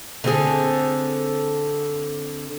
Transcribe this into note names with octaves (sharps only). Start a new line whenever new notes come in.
D3 C4 G#4